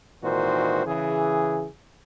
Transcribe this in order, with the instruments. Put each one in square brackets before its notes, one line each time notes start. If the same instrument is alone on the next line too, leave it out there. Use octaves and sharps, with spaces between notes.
[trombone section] G#1 A#2 D#3 E3 F#4 C5
C#3 E3 G#4